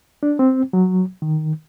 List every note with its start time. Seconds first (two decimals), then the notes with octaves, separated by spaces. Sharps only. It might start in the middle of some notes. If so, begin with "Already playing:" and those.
0.23 D4
0.39 C4
0.73 F#3
1.22 D#3